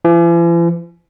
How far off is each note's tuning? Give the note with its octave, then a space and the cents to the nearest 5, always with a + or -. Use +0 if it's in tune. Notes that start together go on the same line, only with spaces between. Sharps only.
E3 +45